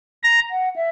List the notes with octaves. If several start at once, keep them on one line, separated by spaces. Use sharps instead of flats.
A#5
F#5
E5